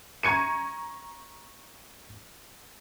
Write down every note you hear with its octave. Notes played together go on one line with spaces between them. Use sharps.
A#5 C#6 G#6 C#7 D#7